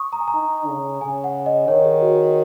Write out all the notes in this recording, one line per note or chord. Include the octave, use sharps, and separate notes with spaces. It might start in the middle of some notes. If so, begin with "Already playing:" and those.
Already playing: C#6 D#6
A#5
G#5
A#5
D#4
C#3
C#3 G#5
F#5
D#5
D#3 C#5
G#4
F#4